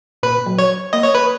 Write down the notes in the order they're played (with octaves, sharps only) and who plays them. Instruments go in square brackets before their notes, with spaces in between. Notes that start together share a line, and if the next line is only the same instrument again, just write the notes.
[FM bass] A#2 [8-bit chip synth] B4
[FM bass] F#3
[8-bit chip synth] C#5
[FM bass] A#3 [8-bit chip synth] D#5
[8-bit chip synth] C#5
B4